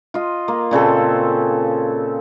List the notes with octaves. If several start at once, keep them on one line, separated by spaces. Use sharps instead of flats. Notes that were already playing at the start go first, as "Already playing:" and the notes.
F4 D#5
A#3
A#2 C#3 C4 A4